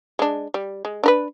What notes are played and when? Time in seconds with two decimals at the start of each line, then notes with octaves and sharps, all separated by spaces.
0.19 G#3 D4
0.54 G3
0.85 G#3
1.03 D4 A#4 B4